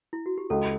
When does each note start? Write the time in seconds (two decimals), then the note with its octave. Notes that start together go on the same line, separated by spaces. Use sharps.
0.13 E4
0.26 F#4
0.38 G4
0.50 C#2 A4